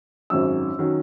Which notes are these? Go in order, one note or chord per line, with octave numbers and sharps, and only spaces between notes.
G#1 F#2 D#3 F#3 C#4 E6
D#3 F#3 C#4